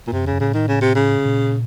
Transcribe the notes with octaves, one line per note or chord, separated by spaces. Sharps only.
A#2
F#2 C3
F2 C#3
F#2
A2 C#3
D#3
C#3
C3
C#3
A#2